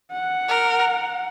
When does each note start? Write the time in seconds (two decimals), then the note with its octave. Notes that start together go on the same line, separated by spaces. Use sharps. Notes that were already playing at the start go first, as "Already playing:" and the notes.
0.12 F#5
0.49 A#4